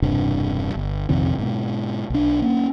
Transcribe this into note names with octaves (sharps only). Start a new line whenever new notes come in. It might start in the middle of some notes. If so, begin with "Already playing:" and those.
E1 G2 C3 D4
G1
A#1 F2 C3 D#3
G#2 B2
B1 D4
A#3 C#4